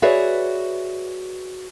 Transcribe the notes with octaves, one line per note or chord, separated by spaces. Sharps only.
F#4 G#4 B4 C#5 D5 E5